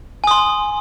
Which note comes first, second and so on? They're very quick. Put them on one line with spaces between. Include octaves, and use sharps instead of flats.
G#5 D#6 C6